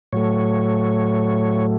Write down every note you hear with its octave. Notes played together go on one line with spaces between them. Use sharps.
A2 F#3 A3 C#5